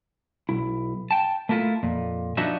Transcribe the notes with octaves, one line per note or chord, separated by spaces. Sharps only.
B1 E4
G5 A5
A3 A#3 E4 F4
F2 A#2
F3 B3 D4 D#4 F#4 E5